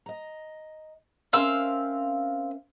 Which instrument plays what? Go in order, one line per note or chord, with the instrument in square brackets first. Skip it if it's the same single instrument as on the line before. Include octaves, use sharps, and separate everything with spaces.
[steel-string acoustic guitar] D#5 A#5
[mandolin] C4 F5 E6 [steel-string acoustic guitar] C#4 A#4 E5